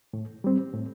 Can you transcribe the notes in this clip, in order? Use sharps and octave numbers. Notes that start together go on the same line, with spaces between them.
A2
G3 C4
A2